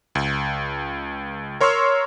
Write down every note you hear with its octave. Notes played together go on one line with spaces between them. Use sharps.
C#2
A#4 C#5 C6 C#6 E6 F6